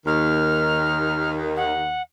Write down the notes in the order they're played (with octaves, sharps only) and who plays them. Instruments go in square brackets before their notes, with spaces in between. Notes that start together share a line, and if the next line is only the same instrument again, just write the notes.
[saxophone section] D#2 D#3 [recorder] F6
[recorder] F#5